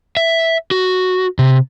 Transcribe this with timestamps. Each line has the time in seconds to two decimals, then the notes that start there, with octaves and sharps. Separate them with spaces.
0.17 E5
0.71 F#4
1.39 C3